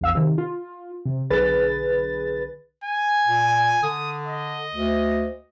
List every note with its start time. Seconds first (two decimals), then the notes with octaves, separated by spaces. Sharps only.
0.01 A#1 E2 F5 E6
0.15 C3 D#3
0.38 F4
1.05 C3
1.30 B1 D3 G#4 B4 A6
2.84 G#5
3.26 A#2
3.83 D3 D#6
4.27 D#5
4.73 D2